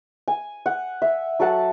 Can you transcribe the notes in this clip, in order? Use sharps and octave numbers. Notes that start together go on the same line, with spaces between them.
G#5
F#5
E5
F#3 A4 F#5 A5